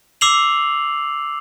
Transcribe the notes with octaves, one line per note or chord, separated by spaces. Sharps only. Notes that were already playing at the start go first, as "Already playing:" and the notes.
D6 E6 C7 F7 F#7